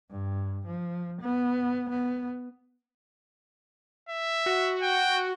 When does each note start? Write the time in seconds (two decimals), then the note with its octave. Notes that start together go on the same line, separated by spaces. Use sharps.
0.11 G2
0.66 F3
1.22 B3
1.90 B3
4.09 E5
4.46 F#4
4.82 G5